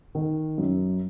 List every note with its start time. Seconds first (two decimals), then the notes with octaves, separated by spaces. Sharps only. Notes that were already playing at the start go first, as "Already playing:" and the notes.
0.15 D#3
0.58 F#2